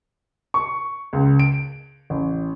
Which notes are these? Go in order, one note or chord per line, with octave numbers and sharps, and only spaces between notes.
C#6
C#2
D7
A1